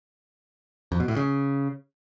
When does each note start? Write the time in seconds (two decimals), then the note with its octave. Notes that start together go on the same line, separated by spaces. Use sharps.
0.92 F2
1.00 B2
1.08 A2
1.16 C#3